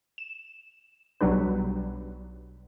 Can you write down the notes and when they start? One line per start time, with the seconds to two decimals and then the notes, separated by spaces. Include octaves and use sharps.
0.18 E7
1.21 B1 F#3 G3 D4 B4